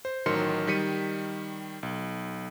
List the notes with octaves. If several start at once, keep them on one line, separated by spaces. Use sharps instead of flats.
C5
A1 D#3 F#3 A#4 C6 C#7
D#3 G3 B6 C#7 D#7
B1